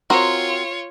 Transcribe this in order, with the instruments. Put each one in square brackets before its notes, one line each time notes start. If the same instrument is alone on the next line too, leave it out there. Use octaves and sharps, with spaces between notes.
[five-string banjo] C4 F#4 A#4 [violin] F4 C#5